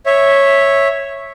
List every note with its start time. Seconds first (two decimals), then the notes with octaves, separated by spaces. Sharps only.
0.06 C#5 E5